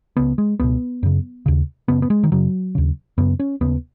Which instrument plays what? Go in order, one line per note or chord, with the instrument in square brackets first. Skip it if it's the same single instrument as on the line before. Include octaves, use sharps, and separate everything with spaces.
[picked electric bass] C#2 C#3 B3
G#3
C#2 B2 B3
F#2 C#3
D#2 C#3
F#2 C#3 B3
B3
G#3
D#3
F#2 C#3 F#3
D#2 C#3
F#2 C#3 B3
C#4
D#2 C#3 B3